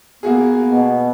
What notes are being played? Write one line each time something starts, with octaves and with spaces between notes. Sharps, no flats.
A#3 B3 F#4 G#4
B2